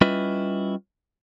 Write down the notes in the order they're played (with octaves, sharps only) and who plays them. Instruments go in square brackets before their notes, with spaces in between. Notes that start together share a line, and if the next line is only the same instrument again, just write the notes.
[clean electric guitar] G3 C#4 E4 F4 B4 D#5